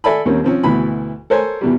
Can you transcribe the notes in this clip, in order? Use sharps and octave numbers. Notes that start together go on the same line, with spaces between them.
A4 D5 E5 G#5 B5
D#2 G3 A#3 C4 C#4
F3 C4 C#4
D2 B2 E3 B5
A4 A#4 C5 C#5 G#5
E2 B2 G3